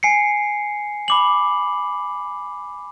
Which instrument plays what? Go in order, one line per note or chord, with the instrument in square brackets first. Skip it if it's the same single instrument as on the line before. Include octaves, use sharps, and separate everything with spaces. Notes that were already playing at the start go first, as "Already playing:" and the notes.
[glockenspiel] G#5 C7 C#7
B5 D6 F#7